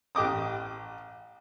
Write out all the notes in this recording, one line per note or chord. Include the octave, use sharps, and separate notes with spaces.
A1 G4 D#5 D6 D#6